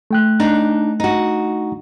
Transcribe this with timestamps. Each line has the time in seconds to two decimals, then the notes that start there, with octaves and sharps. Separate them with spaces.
0.11 A3 G5 F#6
0.40 D4 D#4
1.00 D#4 F#4